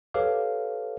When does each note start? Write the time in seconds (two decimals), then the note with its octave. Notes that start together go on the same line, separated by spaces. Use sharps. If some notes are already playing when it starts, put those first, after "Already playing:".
0.14 G4 A4 B4 C#5 F5 D6